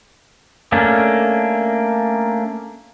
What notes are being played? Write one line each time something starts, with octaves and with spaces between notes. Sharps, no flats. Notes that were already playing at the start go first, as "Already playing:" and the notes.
A3 A#3 C#4 D4